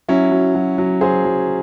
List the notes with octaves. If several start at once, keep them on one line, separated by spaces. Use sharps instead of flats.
F#3 C#4 E4
F#3
F#3
F#3
F#3 G#4 C5
F#3